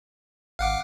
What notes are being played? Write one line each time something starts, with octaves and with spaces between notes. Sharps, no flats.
G#1 F5 F#5 D6